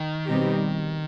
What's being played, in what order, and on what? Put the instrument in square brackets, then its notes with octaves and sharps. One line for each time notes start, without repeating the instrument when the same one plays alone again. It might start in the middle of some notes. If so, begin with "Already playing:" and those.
Already playing: [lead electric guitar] D#3
[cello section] B2 G3 C4 D#4 G4